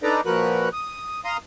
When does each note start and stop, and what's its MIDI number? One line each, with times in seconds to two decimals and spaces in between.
0.03 0.21 62
0.03 0.21 63
0.03 0.21 69
0.03 0.21 71
0.03 0.21 74
0.03 0.21 82
0.26 0.69 46
0.26 0.69 53
0.26 0.69 66
0.26 0.69 70
0.26 0.69 71
0.26 0.69 90
0.73 1.20 87
1.25 1.37 77
1.25 1.37 82
1.25 1.37 84
1.25 1.37 87